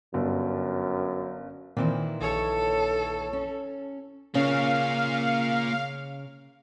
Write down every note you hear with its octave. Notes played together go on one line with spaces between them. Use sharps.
G1 F#2
A#2 D#3 E3 C4 E4
A#1 A4 C#5
C#4
C#3 A#3 C#4 F4 F5